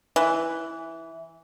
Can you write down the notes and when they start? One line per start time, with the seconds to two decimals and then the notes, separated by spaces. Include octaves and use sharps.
0.16 E3